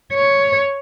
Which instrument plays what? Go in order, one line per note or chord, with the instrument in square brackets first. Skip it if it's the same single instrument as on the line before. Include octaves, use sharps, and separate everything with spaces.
[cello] C#5